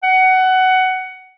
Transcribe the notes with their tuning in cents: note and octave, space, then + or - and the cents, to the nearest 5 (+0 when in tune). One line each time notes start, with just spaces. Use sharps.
F#5 +15